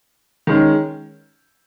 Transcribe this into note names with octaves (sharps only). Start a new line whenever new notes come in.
D#3 G#3 C#4